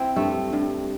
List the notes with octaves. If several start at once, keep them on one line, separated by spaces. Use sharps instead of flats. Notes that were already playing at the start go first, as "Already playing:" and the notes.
Already playing: C4 E4
G2 A3
G2